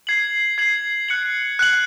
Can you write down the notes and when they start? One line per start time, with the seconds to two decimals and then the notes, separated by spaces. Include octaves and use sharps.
0.07 G#6 C7 F#7
0.58 G#6 C7 F#7
1.08 F#6 C#7 F#7
1.59 F#6 C#7 F#7